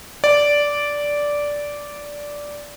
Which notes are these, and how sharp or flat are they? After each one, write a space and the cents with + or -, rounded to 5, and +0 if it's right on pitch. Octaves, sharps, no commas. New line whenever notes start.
D5 -10